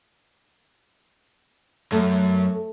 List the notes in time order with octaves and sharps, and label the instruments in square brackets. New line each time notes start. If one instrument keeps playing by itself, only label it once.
[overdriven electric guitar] F#2 [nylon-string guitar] A3